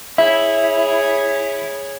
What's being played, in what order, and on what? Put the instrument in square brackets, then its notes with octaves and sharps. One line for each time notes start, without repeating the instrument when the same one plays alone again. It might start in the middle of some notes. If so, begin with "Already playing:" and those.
[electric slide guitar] E4 [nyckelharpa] G#4 C#5 [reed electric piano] E5